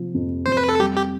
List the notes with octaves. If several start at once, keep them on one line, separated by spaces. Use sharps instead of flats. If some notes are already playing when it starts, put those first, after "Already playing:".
Already playing: C3 F3
F2
F2 C5
B4
A4
G3 G4
G4